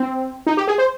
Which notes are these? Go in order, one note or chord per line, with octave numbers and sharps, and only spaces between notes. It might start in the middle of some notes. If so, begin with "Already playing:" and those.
Already playing: C4
D#4
G4
G#4
C5